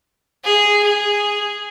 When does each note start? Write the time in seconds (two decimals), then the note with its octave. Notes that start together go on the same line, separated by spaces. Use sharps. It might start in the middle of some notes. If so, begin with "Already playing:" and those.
0.44 G#4
0.83 G#4